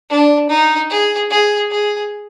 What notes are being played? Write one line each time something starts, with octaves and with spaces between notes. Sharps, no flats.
D4
D#4
G#4
G#4
G#4